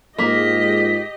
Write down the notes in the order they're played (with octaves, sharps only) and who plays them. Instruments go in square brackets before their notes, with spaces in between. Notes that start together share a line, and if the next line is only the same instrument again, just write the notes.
[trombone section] G#2 G#3 F4 [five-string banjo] A#3 [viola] G4 D#5 [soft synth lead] B6